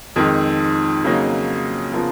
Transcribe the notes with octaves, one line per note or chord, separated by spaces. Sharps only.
F2 D#3 G#3
F2 C#3 F#3 A#3 D#4
C#3 F3 B3 F4 A#4